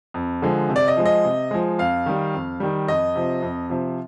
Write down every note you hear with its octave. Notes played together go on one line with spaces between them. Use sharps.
F2
D3 F3 G#3
C3
D5
D#5
F3 G#3
D#5
C3
F3 G#3
F2 F5
D#3 G3
F2
D#3 G3
F2 D#5
C3 F3
F2
C3 F3